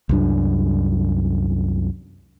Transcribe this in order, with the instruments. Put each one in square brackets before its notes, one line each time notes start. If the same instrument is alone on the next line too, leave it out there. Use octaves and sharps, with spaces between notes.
[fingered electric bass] C2 F#2 D4